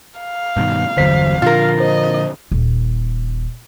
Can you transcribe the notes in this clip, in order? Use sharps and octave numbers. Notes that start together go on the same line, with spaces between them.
F5
G2 B2 D#3
G1 E2 D3 F#3 C5 B6
A#2 D3 F3 F4 A#4 F6
C5 D#5
D#1